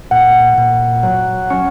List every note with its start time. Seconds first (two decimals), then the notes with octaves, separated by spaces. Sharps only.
0.11 A#2 F#5
0.58 A#2
1.03 F#3
1.50 C#4